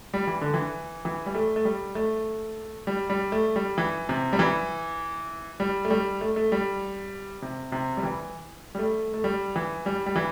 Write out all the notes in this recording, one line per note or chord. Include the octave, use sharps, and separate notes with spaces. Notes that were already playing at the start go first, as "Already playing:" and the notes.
G3
E3
D3
E3
E3
G3
A3
A3
G3
A3
G3
G3
A3
G3
E3
C3
G3
E3
G3
A3
G3
A3
A3
G3
C3
C3
G3
E3
G3
A3
A3
G3
E3
G3
G3
E3